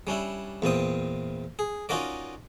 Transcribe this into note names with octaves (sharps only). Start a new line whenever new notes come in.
G3 C#4 D4 E4
E2 A#2 C4 D#6
G#4
C#4 D#4 F4 F#4 A#4 D5